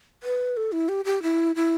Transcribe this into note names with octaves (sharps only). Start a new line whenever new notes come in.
B4
A4
E4
G4
G4
E4
E4